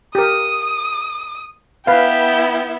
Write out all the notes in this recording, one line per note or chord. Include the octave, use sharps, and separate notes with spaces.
G4 A#4 D#6
B3 E4 B4 F5 G5